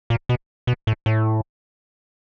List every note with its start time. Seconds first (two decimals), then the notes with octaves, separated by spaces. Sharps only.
0.10 A#2
0.29 B2
0.67 B2
0.87 A2
1.06 A2